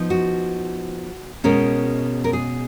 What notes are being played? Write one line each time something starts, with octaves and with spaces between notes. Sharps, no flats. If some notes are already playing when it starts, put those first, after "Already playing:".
Already playing: F3 B3 D#4
F#4
B2 G#3 C#4 A#4
A#4
G#4